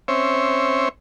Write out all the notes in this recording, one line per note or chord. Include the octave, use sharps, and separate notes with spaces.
C4 C#4 C5 C#5 E5